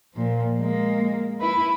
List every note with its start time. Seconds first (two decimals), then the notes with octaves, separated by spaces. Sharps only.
0.14 A#2 F3
0.58 G#3 A#3
1.40 E4 B4